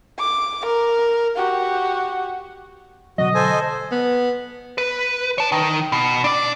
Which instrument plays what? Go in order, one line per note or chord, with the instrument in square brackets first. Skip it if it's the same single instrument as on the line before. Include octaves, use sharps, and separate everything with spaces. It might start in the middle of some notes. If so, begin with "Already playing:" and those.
[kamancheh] D6
A#4
F#4 G4
[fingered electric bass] B2 D3 F#3 [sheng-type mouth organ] F#4 [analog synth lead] D#5
[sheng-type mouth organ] A4 C5 G#5
[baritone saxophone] B3
[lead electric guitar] B4
C#5 A5
D#3
B2
D4 D5